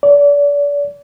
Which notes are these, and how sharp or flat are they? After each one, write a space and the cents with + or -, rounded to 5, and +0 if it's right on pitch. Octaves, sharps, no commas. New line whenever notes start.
D5 -35